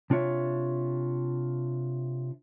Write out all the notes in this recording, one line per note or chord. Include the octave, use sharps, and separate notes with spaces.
C3 D4 F4 C#5 E5